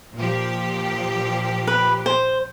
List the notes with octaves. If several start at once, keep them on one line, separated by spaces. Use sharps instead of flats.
A#2 F3 G4
B4
C5